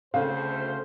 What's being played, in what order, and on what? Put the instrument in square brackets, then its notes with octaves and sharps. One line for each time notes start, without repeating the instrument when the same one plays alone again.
[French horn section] D2 A4 [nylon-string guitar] C#3 C4 [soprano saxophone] C5 [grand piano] F5